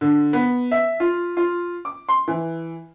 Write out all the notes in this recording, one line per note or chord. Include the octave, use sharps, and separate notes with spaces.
D3
B3
E5
F4
F4
D6
C6
E3